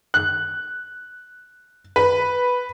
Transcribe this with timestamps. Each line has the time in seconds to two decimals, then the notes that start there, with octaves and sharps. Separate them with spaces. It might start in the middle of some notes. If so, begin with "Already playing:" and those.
0.14 F#6
1.96 B4